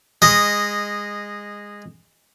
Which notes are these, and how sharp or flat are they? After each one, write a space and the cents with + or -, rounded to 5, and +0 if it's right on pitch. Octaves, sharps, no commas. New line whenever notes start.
G#3 -15 D#5 -5